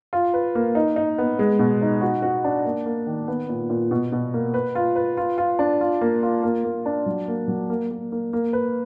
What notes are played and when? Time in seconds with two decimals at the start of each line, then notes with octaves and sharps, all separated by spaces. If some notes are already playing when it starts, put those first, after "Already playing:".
0.13 F4
0.34 B4
0.55 A#3
0.75 D#4
0.96 D#4
1.18 B3
1.39 G#3
1.59 B2
1.81 D#4
2.01 F#4
2.22 F#4
2.44 D4
2.65 A#3
2.86 A#3
3.07 D#3
3.28 B3
3.49 A#2
3.70 A#2
3.91 B2
4.12 B2
4.34 A#3
4.54 B4
4.75 F4
4.96 B4
5.17 F4
5.38 F4
5.59 D4
5.81 F4
6.01 A#3
6.23 F4
6.43 A#3
6.64 A#3
6.86 D4
7.06 F#3
7.28 A#3
7.48 F#3
7.70 A#3
7.91 A#3
8.12 A#3
8.33 A#3
8.53 B4